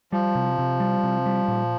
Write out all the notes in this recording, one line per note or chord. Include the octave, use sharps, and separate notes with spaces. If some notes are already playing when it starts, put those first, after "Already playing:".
F3 G3
C3
C3
G3
C3
G3
A#2